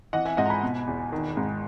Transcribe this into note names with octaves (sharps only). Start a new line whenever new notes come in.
E3 D#5 F#5
E5 G#5
G#2 D#5 F#5
A#5
G#5 B5
B2
E2
D#3
G#2